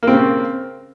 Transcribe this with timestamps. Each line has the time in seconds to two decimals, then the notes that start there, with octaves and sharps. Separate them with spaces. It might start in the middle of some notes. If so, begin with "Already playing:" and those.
0.03 A#3
0.07 C4
0.12 C#3